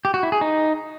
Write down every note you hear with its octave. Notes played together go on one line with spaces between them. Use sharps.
G4
F#4
E4
G#4
D#4